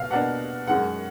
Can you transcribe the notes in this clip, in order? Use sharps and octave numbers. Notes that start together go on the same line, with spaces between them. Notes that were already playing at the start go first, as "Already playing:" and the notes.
Already playing: B2 F5
B2 A#3 D4 F#5
F#2 D#3 G#3 F#5